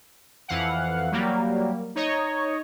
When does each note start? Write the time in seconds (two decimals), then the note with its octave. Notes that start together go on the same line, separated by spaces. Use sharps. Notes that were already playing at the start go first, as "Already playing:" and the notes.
0.48 F2 E3 F5 F#5
1.12 F#3 G3 A#3
1.95 D#4 C#5 D#5